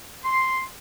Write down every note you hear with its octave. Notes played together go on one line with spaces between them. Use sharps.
C6